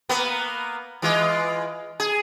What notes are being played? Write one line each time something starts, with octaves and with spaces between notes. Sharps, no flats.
A#3 B3
E3 G#3 F4
G#4